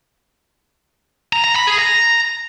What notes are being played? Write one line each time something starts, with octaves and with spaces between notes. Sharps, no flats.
A#5
A#5
B5
G#4
A#5